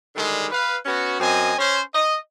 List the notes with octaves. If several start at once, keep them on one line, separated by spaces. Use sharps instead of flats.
D3 D#3 G3 G#3
B4 F5
B3 C#4 F#4
F#2 C4 D#5 G#5
C#4 C5
D#5